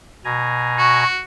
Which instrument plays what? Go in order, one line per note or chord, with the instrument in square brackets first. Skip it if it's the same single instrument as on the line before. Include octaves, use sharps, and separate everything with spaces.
[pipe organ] B2 G#5 A#5
[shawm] F#4 [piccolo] C#6